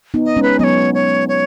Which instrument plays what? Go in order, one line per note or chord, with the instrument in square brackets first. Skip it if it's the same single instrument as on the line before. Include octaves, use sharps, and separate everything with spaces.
[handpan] B3 D#4
[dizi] D#5
[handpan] G#3 C#4
[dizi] B4
[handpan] F#3 B3 [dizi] C#5 D#5
[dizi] C#5
C#5